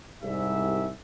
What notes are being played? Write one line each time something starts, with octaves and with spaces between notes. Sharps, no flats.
C2 G#2 G3 E5